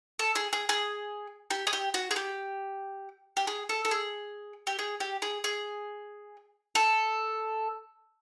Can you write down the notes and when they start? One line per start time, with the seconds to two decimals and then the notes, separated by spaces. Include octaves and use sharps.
0.19 A4
0.35 G#4
0.53 G#4
0.69 G#4
1.51 G4
1.67 G#4
1.73 G4
1.94 F#4
2.11 G#4
2.16 G4
3.37 G4
3.47 G#4
3.69 A4
3.85 A4
3.91 G#4
4.67 G4
4.79 G#4
5.00 G4
5.22 G#4
5.44 G#4
6.75 A4